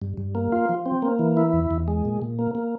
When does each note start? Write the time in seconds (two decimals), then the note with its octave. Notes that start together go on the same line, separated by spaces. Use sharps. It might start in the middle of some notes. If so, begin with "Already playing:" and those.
0.02 G2
0.17 G2
0.35 A#3
0.52 F4
0.69 F3
0.86 C4
1.02 A#3
1.19 E3
1.37 E4
1.53 E2
1.71 E2
1.88 G#3
2.05 A#2
2.22 A#2
2.39 A#3
2.55 A#3